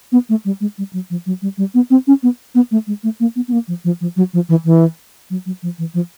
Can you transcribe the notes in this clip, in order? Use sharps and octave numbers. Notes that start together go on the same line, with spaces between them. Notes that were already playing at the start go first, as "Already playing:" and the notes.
B3
A3
G3
G#3
G3
F#3
F3
F#3
G3
G3
B3
C4
C#4
B3
B3
A3
G#3
A3
A#3
B3
B3
A#3
F3
F3
F3
F#3
F3
E3
E3
F#3
F#3
F3
E3
F3